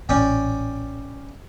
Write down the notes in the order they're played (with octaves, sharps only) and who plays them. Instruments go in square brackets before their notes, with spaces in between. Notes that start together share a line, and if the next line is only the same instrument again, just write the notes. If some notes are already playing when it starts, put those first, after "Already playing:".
[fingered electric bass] A1 A#2 [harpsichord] C#4 D5 G5